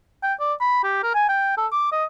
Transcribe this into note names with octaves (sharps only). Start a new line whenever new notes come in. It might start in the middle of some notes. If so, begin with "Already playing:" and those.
G5
D5
B5
G4
A#4
G#5
G5
A4
D6
D#5